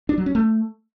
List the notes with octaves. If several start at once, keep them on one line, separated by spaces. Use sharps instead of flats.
D4
F#3
C#4
A3